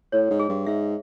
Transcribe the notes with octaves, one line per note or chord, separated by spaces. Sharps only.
A2 C#5
G#2
G#4
G2
G#2 E5